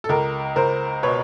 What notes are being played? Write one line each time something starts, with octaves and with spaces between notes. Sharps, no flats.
A4
C#2 A#4
C#2 A#4 C5
B2 B4 C#5